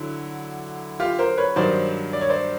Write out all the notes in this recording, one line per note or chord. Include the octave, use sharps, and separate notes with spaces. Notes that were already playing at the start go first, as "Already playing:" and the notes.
Already playing: D3 F#3 E4 F#4
F4 G4
A#4 C5
B4 C#5
G2 D#3 F#3 C5 D5
D5
C#5
C5 D5